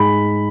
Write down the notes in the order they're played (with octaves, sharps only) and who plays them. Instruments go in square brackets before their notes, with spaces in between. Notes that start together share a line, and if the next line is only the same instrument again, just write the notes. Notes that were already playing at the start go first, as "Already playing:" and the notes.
Already playing: [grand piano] G#2 G#3 B5